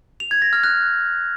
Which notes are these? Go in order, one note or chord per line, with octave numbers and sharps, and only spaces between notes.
F7
G#6
A#6
F6
F#6